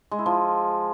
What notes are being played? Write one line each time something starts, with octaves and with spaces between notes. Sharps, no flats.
G#3
E4
F3